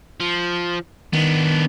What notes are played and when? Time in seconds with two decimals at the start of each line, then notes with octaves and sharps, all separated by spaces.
0.20 F3
1.13 D#3 B3 D4